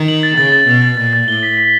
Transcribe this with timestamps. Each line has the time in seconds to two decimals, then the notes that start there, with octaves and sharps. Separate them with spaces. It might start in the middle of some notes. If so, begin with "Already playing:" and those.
Already playing: D#3
0.08 F#7
0.23 A6
0.38 C#3 A6
0.52 A6
0.67 B2 A6
0.82 A6
0.97 A#2 A6
1.13 A6
1.28 A2 G7
1.43 B6
1.57 B6